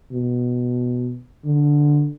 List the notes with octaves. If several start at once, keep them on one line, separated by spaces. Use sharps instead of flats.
B2
D3